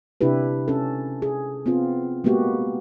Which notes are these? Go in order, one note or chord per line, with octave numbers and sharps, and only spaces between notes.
C3 D4 E4 G4 B4
C#4 A4
G#4
B3 C4 F4
G#3 A#3 B3 F#4 G4